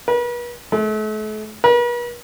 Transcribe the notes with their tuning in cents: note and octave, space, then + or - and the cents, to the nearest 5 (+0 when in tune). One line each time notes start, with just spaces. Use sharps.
B4 -40
A3 -40
B4 -45